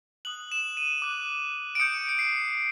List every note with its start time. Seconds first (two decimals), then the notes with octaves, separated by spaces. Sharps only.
0.25 D#6 F#6 F#7
0.52 E7
0.77 D#7
1.02 D6 F#6
1.75 D7
1.79 D#6 G6 C#7
2.09 C#7
2.19 C7